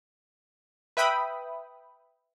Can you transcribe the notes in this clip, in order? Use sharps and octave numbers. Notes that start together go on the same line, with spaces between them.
B4 E5 G5 B5 D#6